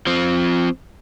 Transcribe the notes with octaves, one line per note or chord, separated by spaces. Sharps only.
F3 C4